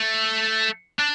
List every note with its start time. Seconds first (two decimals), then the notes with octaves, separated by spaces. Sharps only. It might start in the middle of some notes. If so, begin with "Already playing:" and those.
Already playing: A3
0.99 D4